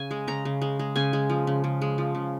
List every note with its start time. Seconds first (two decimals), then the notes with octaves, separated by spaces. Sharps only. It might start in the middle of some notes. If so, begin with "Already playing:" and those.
Already playing: C#3 G#5
0.11 G#3
0.27 C#3 A#5
0.45 C#3
0.62 G#3
0.79 G#3
0.96 C#3 G#5
1.13 G#3
1.30 F3
1.47 C#3
1.64 C#3
1.82 G#3
1.98 F3
2.15 C#3